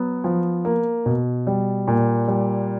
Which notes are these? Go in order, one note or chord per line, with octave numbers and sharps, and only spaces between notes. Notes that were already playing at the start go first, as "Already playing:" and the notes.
Already playing: F#3 B3
F3
A#3
B2
G3
A#2
G3